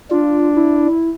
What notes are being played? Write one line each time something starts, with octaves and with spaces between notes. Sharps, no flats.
D4 F4
E4